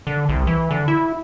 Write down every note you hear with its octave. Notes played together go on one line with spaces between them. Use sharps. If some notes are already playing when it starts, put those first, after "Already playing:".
D3
C2
E3
D3
E4